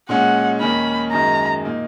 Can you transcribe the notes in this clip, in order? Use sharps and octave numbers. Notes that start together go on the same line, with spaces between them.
A#2 G#3 C#4 F#5
D#2 D#3 A#3 C#4 B5
F#2 D#3 G#3 A#5
A#2 A#3 D#4